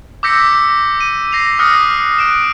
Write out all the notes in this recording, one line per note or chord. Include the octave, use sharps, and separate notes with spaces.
D6 E6 G6 A#6 B6 C#7
D#7
A#6 C7 F7
D#6 F6 F#6 A#6 C#7
F#6 D7 E7